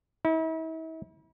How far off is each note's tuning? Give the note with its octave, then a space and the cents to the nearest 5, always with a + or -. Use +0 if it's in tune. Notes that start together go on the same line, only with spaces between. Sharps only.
E4 -45